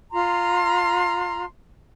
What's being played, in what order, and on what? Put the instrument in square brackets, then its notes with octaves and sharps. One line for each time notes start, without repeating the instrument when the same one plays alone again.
[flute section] F4 A#5 C6